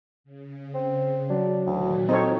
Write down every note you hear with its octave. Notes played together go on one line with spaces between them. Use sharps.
C#3
C4
F#3 D4
D2 A#2 D#3 E3
C4 D#4 F4 F#4 A4 C#5